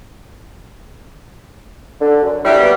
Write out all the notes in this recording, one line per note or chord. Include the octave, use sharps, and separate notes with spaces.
D3
F#2
F#3 G3 D4 E4
A#3 B3